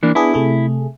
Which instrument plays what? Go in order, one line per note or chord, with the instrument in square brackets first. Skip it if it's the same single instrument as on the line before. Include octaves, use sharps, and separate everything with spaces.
[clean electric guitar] E3 A#3 D4
[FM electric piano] B3 D4 G#4 [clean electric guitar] E4
[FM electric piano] C3 A3 G#4